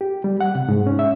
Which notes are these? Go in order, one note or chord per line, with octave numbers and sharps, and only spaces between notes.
G4
G3
F#5
C3
G#2
C#4
E5